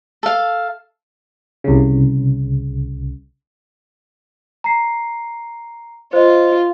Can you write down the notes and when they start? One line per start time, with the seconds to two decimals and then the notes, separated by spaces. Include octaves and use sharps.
0.23 A4 F5
1.64 C2 C#3
4.64 A#5 C7
6.13 F4 C5 D#5